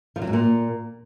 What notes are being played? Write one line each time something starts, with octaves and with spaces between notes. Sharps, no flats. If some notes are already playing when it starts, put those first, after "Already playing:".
F3
F#3
G#2
A#2